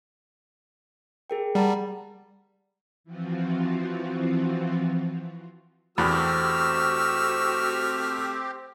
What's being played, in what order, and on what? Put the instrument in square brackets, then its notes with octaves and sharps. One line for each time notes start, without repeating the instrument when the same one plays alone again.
[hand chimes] G#4 A#4 G5
[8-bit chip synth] G3 [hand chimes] F#5 A5 A#5
[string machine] E3 F3 C4 F4 F#4
[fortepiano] E2 [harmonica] A3 E6 F6 [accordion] C4 G4 [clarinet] F#4